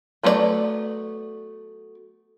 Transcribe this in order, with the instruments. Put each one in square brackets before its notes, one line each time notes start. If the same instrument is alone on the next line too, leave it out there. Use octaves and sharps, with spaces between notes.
[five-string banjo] F#3 A3 B3 E4 D5